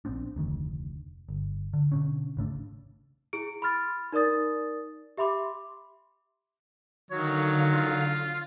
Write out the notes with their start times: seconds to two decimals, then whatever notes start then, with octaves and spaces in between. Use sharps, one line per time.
0.05 A#1 B3 C4 D4
0.36 F1 D2 D#3
1.29 G1
1.74 D3
1.92 B2 D3 C#4
2.37 G#1 C#3 A3 D4
3.33 E4 G#4 D7
3.62 B5 C6 F6 A6
4.12 D#4 A#4 D5 D#6 A6
5.17 G4 E5 B5 C6 D6
7.11 D3 D#3 F#3 C#5 F5
7.73 F4